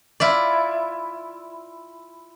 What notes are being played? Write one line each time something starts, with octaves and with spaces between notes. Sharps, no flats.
E4 F4 D5